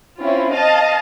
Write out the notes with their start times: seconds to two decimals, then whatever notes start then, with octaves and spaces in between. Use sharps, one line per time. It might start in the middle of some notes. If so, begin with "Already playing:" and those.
0.21 C4 C#4 E4 F4
0.52 D#5 F5 A5